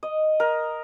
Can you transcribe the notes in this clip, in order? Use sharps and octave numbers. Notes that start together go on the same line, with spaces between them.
D#5
A#4